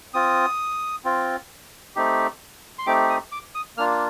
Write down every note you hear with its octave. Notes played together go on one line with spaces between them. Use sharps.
C4 F4 D#6
C4 F4
A3 C4 D#4 G4
C6
A3 C4 D#4 G4 D6
D#6
D6
D#6
A#3 D4 F4 F6